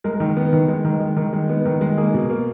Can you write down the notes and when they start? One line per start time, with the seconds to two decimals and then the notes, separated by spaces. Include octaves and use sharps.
0.04 G#3 A#4
0.20 D#3
0.37 B3
0.53 D#3
0.68 G#3
0.85 D#3
1.00 G#3
1.16 D#3
1.33 G#3
1.49 B3
1.65 D#3
1.81 G#3
1.98 A#3 G#4
2.14 B2
2.30 A#3